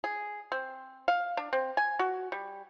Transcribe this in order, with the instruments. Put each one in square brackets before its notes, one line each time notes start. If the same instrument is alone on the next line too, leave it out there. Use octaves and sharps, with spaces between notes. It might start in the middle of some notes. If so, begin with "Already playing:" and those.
[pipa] G#4
C4
F5
D4
C4
G#5
F#4
G3